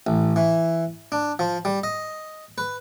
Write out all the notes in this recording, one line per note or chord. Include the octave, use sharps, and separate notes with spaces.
A1
E3
D4
F3
G3
D#5
B4